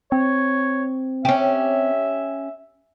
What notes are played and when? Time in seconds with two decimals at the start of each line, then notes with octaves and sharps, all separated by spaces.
0.12 C4 C#5
1.25 C#4 G4 E5